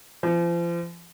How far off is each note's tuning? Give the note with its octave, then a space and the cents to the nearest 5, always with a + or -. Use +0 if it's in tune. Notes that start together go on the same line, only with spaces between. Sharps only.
F3 -35